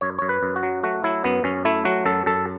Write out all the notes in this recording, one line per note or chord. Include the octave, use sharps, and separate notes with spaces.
F#2 C#5
F#2 C#5
B4
F#2
F#4
F#3
A3 F#4
F#3 E4
F#2 B3
F#2 C#4
A3 E4
F#3 F#4
F#2 A4
F#2 A4